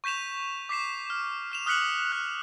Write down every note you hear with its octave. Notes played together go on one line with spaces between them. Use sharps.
C#6 G6 B6 E7 F7
D6 B6 C7 E7
F6
F6 E7 F7
D#6 F6 F#6 B6 C#7 F#7
F#6